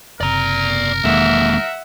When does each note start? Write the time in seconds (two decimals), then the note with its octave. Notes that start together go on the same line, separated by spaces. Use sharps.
0.21 F#1 C3 A#4 D5 A#5
1.05 E1 D#3 G#3 A#3 E5 F#5